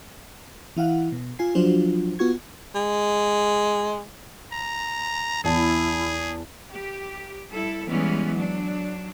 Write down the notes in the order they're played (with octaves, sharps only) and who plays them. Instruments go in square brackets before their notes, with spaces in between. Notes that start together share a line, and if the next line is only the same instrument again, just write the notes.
[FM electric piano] E3 E4 F5 F#5
B2
F4 G#5 C7
F3 F#3 D4 F4 F#4 C5
B3 F4 F#4 C#6 G#6
[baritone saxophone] G#3
[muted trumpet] A#5
[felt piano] E2 A5 [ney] E4 [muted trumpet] G#4
[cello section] G4
G3 E4 A4
E3 G3 G#3 B3 C#4
F#3 D4